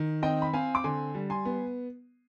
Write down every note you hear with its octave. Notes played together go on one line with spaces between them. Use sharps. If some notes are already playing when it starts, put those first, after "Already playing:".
Already playing: D#3
C4 D#5 G5
B5
C4 F5 G#5
D6
D3 G#5 C6
G3
G#5 C6
B3